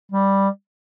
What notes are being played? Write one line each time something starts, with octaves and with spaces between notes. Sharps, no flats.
G3